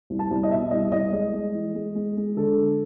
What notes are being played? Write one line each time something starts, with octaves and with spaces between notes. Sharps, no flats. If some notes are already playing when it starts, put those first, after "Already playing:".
C2
A5
C2
D#5
B2 E5
C2 D#5
C2 D#5
G#3 D#5
G#3
E3
G#3
G#3
G#3
D3 A4
D3